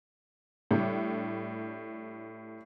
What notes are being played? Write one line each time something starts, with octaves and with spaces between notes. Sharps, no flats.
A2 G3 D4